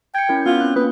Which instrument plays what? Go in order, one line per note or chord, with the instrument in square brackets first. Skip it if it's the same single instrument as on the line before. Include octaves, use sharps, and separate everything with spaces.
[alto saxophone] G5 [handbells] G#6 C#7
[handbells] C#4 E4 A#4
[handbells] B3 C#4 [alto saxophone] F4
[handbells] C4 F#6
[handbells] A#3 [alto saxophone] B4